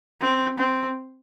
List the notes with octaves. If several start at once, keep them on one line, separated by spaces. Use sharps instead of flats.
C4
C4